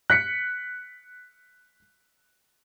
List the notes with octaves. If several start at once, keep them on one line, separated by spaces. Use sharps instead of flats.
F#6 B6 C#7